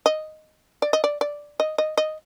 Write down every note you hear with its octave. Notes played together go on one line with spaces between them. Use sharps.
D#5
D5
D#5
D5
D5
D#5
D#5
D#5